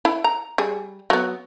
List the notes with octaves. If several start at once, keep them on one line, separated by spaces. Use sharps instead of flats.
E4
A#5
G3 G#4
F#3 B3